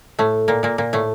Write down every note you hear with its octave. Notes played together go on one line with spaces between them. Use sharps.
A2 A3
A#2 A#3
A#2 A#3
A#2 A#3
A2 A3